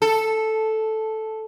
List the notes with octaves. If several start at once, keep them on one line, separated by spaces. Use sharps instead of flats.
A4